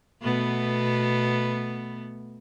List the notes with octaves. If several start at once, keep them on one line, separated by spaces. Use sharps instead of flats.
B2 A3 B3